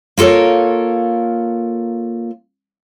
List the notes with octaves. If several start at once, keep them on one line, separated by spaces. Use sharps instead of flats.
A#3 F4 A4 A#4 C#5